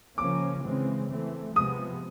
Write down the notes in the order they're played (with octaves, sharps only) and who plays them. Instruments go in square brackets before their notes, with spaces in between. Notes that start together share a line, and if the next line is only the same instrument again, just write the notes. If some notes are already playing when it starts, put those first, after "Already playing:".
[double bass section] C#3 F3 A#3 C#4 [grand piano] D6
[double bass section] C#3 E3 G#3 C4
E3 A3 C4
[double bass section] C3 F3 G#3 B3 [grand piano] D#6